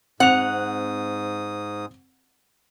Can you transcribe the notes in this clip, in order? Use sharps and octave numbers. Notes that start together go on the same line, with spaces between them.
G#2 C4 F#5 D#6 F#6 F7